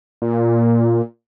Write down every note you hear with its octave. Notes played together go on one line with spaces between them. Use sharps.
A#2